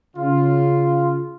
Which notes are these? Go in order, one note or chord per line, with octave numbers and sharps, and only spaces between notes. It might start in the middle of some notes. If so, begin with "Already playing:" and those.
C#3 F4